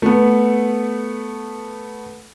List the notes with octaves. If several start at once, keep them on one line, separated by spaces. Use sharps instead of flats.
A3 B3